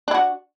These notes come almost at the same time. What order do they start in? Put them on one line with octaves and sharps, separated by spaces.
D4 E4 F#4